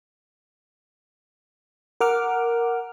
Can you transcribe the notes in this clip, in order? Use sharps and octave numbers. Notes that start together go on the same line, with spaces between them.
A#4 F#5 D6 F6